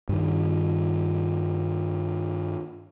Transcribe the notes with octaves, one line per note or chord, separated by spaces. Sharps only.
G2 D#3